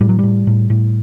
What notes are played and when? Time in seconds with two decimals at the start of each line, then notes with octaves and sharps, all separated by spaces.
0.01 A2 G3
0.09 F#3
0.19 A2 G3
0.47 A2
0.70 A2